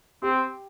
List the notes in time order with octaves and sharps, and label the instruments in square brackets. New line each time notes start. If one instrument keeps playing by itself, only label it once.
[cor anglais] C4 [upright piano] G4